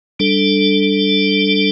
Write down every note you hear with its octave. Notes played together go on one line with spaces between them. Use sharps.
G3 D4 A4